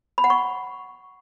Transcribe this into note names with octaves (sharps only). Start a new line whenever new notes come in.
B5
F#5
C#6